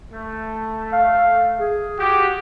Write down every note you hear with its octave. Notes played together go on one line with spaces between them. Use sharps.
A3
F5
G#4
F#4 G4